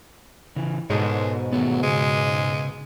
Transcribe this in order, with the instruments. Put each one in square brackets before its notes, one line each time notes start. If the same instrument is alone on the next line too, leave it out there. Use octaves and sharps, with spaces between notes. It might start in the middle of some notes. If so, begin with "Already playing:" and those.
[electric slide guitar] C#3 E3
[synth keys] G#2 B2 [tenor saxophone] G#3 [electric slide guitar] A4 C5 C#5
[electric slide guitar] D#3 A3 B3 [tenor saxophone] F#3
[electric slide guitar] C#3 [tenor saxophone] G#3